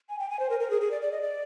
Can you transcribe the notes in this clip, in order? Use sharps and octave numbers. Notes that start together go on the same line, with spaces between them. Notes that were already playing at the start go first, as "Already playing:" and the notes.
G#5
G5
G#5
C5
A#4
A#4
G#4
G#4
D5
D5
D#5
D5